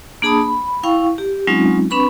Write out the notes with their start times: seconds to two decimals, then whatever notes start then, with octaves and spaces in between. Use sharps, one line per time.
0.22 A#3 D4 G#4 A5 B5 D#6
0.42 B5
0.83 E4 F5 G5 C#6
1.18 G4
1.47 F#3 G#3 C4 C#4 D#4 F4
1.91 C4 D4 B4 B5 C#6